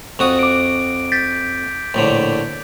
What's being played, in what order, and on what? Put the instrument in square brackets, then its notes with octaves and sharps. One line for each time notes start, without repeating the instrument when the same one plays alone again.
[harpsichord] F2 F#4 D#6
[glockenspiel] D6 D7
G6 A6 B6
[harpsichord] A#1 A2 D3